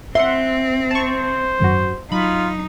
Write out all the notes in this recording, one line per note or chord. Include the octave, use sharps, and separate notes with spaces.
C4 E5 F#5 C6
C5 A5 C#6
G#1 F#2 F#4
F#3 D#4 F4 B5